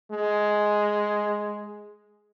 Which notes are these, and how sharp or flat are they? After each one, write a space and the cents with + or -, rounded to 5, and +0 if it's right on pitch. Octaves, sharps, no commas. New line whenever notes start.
G#3 +5